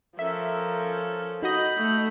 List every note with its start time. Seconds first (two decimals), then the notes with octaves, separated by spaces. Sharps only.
0.19 F3 C#4 A4 A#4 E5
1.43 D#4 F#4 D#5 B5 G6
1.77 A3